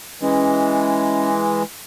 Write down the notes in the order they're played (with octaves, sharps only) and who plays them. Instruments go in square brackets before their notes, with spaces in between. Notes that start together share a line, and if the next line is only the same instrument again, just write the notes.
[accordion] E3 G#3 [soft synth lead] C#4